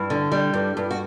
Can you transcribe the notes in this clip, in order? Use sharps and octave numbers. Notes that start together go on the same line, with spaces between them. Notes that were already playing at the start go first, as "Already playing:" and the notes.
Already playing: G2 E4
D3
G3
G2
G2
F#4